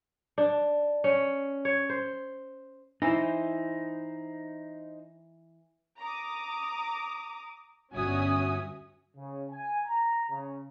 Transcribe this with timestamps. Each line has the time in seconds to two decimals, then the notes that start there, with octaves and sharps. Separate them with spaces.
0.38 D4
1.04 C#4
1.65 C#5
1.89 C5
3.02 E3 D#4 C5
6.00 A#5 D6 D#6
7.92 G1 C#4 F#4 E5 G#5 D#6
9.16 C#3
9.50 G#5
9.86 A#5
10.30 C#3